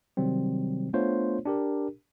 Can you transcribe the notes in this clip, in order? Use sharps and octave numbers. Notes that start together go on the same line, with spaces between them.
C3 D#3 F#3 G3 C4
A3 B3 D4 F4 C5 C#5
D4 G4 A#4